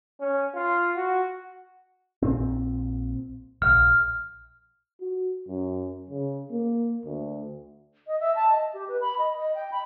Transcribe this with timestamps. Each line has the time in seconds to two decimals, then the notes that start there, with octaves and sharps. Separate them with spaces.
0.20 C#4
0.55 F4
0.96 F#4
2.22 A#1 A#2 C4
3.62 D1 A#1 F6
5.00 F#4
5.48 F#2
6.10 C#3
6.51 A#3
7.05 D2
8.07 D#5
8.20 E5
8.35 A5
8.50 D#5
8.74 G4
8.88 B4
9.01 B5
9.19 D#5
9.37 D#5
9.55 G5
9.72 B5